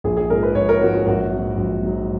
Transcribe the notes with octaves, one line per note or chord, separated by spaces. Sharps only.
A#1 G#4
G#4
G#2 F3 A#4
B4
A#1 C#5
A#4
G#2 F3 F#4
F#4
A#1 F#4
G#2 F#3
A#1
G#2 F#3